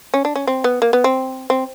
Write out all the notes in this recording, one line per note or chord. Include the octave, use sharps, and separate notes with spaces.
C#4
D4
C#4
C4
B3
A#3
B3
C4
C4